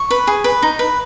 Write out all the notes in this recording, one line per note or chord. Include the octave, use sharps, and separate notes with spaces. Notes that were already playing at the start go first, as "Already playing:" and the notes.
Already playing: C#6
B4
G#4
B4
D#4
B4